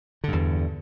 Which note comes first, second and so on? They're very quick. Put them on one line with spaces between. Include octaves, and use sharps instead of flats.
D3 G2 E2